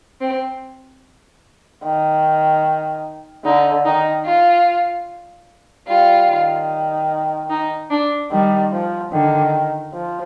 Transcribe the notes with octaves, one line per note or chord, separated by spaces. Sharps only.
C4
D#3
D3 D#4
D#3 D#4
F4
G3 F4
D#3
D#4
D4
D#3 G3
F3
D3 D#3
F3